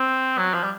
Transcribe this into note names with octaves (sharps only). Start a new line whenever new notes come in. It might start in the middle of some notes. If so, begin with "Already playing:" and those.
Already playing: C4
F#3
F3
G3